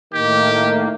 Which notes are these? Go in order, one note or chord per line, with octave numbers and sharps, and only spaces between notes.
A2 D#3 A#3 G4